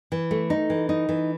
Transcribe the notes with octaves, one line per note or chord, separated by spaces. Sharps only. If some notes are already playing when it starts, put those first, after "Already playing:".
E3
A3
D#4
E3
D#4
E3